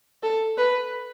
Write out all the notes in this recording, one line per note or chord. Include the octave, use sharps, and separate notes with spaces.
A4
B4